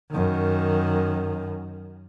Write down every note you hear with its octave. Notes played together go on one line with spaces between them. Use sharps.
F#2 D#3